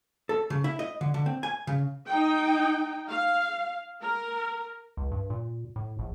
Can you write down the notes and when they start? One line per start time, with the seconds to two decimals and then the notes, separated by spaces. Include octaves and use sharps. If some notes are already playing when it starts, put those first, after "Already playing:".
0.29 A4
0.50 C#3
0.64 E4
0.79 D#5
1.01 D3
1.14 D3
1.26 C4
1.43 G#5
1.67 C#3
2.06 D#4 G5
3.08 F5
4.01 A#4
4.97 C#2
5.11 G2
5.30 A#2
5.76 A2
5.99 A#1